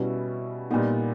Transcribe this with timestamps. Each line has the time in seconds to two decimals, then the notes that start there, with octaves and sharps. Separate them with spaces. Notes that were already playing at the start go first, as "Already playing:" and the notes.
Already playing: B2 G3 C#4 E4
0.70 A#2 G3 B3 D#4